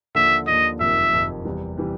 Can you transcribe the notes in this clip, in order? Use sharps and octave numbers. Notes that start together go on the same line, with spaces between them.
D#2 D3 F3 E5
D#2 D3 F3 D#5
F#1 F2 C3 D#3 E5
F#1 F2 C3 D#3
E2 C3 E3 G3
C3 E3 G3